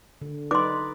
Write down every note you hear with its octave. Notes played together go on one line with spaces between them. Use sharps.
D3
D#4 B4 D5 C6 D6